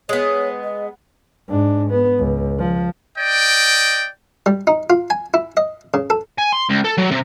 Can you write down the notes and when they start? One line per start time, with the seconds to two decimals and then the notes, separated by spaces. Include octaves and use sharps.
0.09 G#3 B3 C#5
0.63 D#5
1.48 G#2 D4
1.90 B3
2.19 C#2
2.59 F3
3.17 D5 D#5 G5
4.46 G3
4.67 D#4
4.90 F4
5.10 G#5
5.34 E4
5.57 D#5
5.94 C#3
6.10 A4
6.38 G#5
6.52 C6
6.69 C#2
6.84 A4
6.98 F#3
7.11 C3